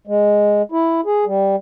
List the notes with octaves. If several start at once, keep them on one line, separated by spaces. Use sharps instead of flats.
G#3
E4
G#4
G3